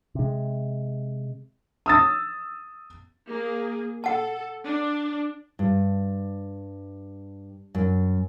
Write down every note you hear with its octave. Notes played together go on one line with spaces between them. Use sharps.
C3 G#3
D#6 E6 A6
A#3 G#4
A4 F#5 A5
D4
G2
F#2